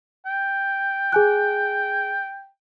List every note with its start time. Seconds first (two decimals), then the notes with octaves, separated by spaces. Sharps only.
0.26 G5
1.12 G#4 G#5 F#6